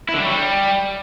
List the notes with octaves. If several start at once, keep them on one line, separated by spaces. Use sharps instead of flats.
E4
D3
G3
F#3
G3